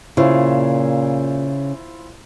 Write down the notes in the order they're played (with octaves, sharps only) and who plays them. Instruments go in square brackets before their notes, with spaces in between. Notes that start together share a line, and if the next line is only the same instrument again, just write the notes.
[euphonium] A#2 [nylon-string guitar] C#3 [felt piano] E4 F4 C5